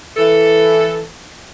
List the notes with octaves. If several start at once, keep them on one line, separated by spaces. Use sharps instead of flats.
E3 A4